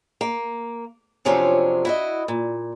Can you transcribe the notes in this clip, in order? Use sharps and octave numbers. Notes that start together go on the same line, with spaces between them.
A#3
F2 C3 F3 F#3 C#4 D4
E4 F#4 D#5
A#2